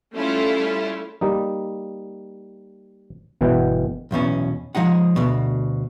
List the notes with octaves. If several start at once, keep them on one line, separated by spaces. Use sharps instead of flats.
G3 A3 C#4 E4 F4
G3 A#3 D#4
G1 B2 E3 F#5 G5
B1 E2 B2 C#4
F3 G#3 D#4 F#5
D2 B2